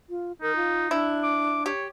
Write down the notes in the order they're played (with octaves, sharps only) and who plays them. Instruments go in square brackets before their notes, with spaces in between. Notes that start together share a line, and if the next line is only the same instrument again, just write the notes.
[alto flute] F4
[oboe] D#4 [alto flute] A#4
[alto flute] F4
[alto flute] D4 [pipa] E4
[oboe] D6
[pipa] G4 [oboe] C#5